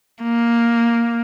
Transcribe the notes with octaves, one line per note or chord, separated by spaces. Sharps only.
A#3